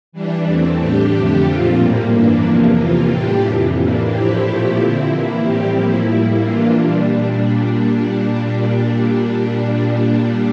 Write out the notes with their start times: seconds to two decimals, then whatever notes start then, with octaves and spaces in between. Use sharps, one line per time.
0.12 E3 G3 D4
0.45 E2 E3 A3 C4
0.78 A2 G3 D4 G4
1.11 F2 D3 A3 D4 G4
1.44 A#2 F3 C4 F4
1.78 A2 G3 A#3
2.11 G2 E3 A#3 D4
2.44 E2 C3 F3 A#3
2.77 C3 E3 A#3 F4
3.09 A2 G3 D4 G4
3.43 F2 C3 E3
3.76 A2 E3 A#3 D4
4.09 A2 F3 C4 E4 G4
4.42 A#2 F3 A3 E4 G4
4.75 D3 F3 C4 E4
5.08 E3 A#3 E4
5.41 A2 G3 C4 G4
5.74 A2 F3 A#3 E4
6.07 A2 G3 A#3 E4
6.40 E3 A#3 D4 F4
6.73 A#2 G3 D4